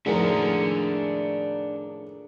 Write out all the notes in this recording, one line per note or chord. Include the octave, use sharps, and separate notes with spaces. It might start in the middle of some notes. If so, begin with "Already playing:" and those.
F2 A2 D#3 D4 G#4 A#4 E5 F#5